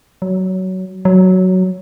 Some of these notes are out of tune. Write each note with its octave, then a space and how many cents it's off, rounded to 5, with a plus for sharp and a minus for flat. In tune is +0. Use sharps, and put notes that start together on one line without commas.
F#3 +15
F#3 +5